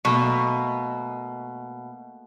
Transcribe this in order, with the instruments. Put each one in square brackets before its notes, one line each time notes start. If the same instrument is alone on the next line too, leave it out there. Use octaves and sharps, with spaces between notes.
[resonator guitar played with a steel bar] B2 [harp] A3 A#3 D#5 [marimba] C#6